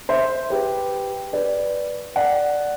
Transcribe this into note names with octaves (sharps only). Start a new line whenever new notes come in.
C5 E5
G4 B4
B4 D5
D5 F#5